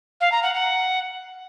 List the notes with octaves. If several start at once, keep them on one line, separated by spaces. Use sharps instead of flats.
F5
A#5
F#5
F#5